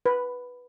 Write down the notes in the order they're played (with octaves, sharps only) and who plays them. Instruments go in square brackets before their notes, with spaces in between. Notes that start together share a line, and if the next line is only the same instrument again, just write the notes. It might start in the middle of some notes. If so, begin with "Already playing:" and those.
[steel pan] B4